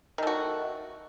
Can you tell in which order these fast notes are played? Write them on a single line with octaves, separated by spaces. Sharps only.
D#3 A3 F#4